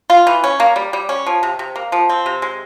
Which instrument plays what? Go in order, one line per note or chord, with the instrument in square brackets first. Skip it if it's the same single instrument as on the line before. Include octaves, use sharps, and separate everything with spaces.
[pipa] F4
E3
C#4
A#3
G3
G3
C#4
F3
C3
C3
A#3
F3
C4
C3
G#3